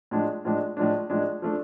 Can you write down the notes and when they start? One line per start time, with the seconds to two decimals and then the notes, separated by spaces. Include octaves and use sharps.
0.11 A2 F3 G#3 D4
0.45 A2 F3 G#3 D4
0.77 A2 F3 G#3 D4
1.10 A2 F3 G#3 D4
1.42 F3 A3 D4